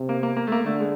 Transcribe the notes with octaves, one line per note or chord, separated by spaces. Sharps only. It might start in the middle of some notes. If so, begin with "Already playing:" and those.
Already playing: C3
A#3
A#3
A#3
A3
A#3
D3 A3
G#3